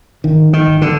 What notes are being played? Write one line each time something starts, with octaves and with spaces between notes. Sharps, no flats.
G#1 D#3
D#3
G#1
D3